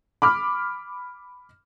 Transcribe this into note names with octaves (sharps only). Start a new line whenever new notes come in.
B5 D6 F6